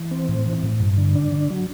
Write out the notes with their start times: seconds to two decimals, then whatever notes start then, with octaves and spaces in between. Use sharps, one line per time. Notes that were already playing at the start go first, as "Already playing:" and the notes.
Already playing: E3
0.11 C4
0.28 A2
0.46 E3
0.63 A2
0.80 G2
0.98 D3
1.16 D4
1.32 D3
1.50 F#3